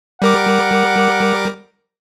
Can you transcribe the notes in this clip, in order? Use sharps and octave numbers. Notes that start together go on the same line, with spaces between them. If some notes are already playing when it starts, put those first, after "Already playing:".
G3 A#4 F#5 D6